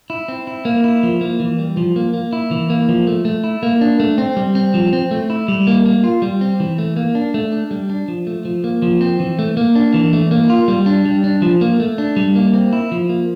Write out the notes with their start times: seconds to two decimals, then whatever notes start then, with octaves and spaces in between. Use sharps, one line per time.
0.10 E4
0.28 C4
0.47 E4
0.65 A#3
0.84 E4
1.03 F3
1.21 A#3
1.40 E3
1.59 G3
1.77 F3
1.96 A#3
2.14 A#3
2.33 E4
2.51 E3
2.70 A#3
2.89 F3
3.07 A3
3.25 A3
3.44 E4
3.63 A#3
3.81 D4
4.00 A3
4.18 C4
4.36 G3
4.55 C4
4.74 F3
4.93 C4
5.11 A3
5.30 E4
5.48 G3
5.67 A#3
5.86 A#3
6.04 F4
6.22 G3
6.41 C4
6.60 E3
6.78 A3
6.96 A#3
7.15 D4
7.34 A3
7.52 D4
7.71 G3
7.90 D4
8.08 F3
8.27 A3
8.45 F3
8.64 A#3
8.82 F3
9.01 C4
9.20 E3
9.39 A3
9.57 A#3
9.75 D4
9.94 E3
10.13 A3
10.31 A#3
10.50 F4
10.68 G3
10.86 D4
11.05 G3
11.24 D4
11.42 F3
11.61 A#3
11.80 A3
11.98 D4
12.16 G3
12.36 A#3
12.54 C4
12.73 E4
12.92 F3
13.09 A#3